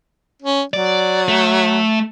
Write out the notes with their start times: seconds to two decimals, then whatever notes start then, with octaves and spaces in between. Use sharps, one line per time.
0.42 C#4
0.74 F#3 D5
1.28 A3